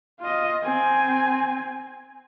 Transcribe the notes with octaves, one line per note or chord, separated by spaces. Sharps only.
F4 D#5
C4 G#5